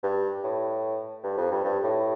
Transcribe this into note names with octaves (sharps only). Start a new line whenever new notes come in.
G2
A2
G2
F2
G2
G2
A2